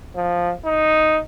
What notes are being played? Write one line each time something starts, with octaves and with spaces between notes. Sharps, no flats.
F3
D#4